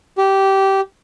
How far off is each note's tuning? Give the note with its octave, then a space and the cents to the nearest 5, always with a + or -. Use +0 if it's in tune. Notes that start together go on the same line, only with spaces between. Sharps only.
G4 -15